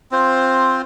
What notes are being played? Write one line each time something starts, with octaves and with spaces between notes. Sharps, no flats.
C4 F4 C5